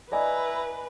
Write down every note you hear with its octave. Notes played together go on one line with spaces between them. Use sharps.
E4 B4 D5 D#5 G#5 A#5